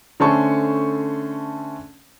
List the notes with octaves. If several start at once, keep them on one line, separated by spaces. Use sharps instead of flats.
D3 A3 C#4 C5 A5 C#6